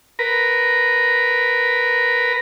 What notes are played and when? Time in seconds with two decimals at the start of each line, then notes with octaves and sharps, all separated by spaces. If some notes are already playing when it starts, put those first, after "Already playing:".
0.19 A#4 B4